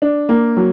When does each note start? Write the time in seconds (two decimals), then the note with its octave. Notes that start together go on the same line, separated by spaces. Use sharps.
0.02 D4
0.29 A#3
0.57 F#3